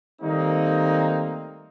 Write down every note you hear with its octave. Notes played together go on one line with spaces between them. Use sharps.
D#3 G3 A3 A#3 C4 D#4